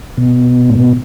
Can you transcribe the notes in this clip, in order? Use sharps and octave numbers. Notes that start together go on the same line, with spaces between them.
B2
A2
B2